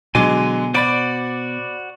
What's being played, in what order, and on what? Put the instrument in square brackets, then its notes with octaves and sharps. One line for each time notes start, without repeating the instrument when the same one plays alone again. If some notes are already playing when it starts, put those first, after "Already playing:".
[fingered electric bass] B2 [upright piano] D3 F#3 G#3 [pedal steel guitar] G#5 C6 D6
[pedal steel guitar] F#4 C5 D6 [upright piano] D5 B5 A6